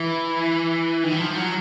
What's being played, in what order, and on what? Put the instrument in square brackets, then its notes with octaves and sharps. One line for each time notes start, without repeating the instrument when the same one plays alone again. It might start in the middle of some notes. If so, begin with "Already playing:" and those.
Already playing: [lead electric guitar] E3
D#3
E3
F3
F#3